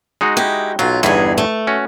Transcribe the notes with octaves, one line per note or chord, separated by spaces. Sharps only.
G#3 D#4 F#4
E4 G4
B1 F#3 F4
G1 E2 G2 E3 D#4 G#4
A3
C#4 F#4